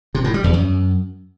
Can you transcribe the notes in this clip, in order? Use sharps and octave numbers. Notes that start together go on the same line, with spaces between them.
C3
A2
G3
E2
F#2